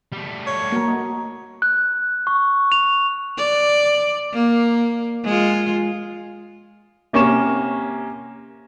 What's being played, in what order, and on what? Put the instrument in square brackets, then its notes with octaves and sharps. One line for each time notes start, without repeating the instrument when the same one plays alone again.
[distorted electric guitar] G3 A3
[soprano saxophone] C#5
[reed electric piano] A#3 [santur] F#4 A#4
[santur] D#5 F#5 B5
[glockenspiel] F#6
C#6
F7
[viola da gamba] D5
A#3
G#3 F4
[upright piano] C3 A#3 C#4 C#6 E7